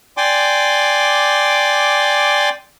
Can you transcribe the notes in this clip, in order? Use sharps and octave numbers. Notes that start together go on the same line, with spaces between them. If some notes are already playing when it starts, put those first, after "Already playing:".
D5 G5 G#5 C6 D6